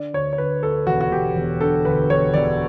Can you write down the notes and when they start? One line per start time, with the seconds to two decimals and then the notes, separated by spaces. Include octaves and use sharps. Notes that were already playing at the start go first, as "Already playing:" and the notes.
Already playing: D3 D5
0.14 D2 C#5
0.33 C#5
0.38 D2 B4
0.63 D2 A4
0.87 E1 F#4
1.01 F#4
1.12 E1 G4
1.36 E1
1.60 D3 A4
1.85 D2 B4
2.10 E1 C#5
2.34 E1 D5